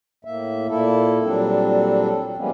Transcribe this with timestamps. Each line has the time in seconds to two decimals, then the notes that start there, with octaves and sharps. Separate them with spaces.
0.25 A2 A#3 E5
0.69 A#2 A#3 E4 A4
1.23 A#2 F#3 G3 C4 D4 A4
2.37 F3 G3 G#3 A#3 B3 C#4